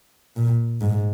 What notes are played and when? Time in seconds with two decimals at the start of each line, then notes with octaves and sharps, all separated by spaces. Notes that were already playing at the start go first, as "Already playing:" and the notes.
0.36 A#2
0.81 G#2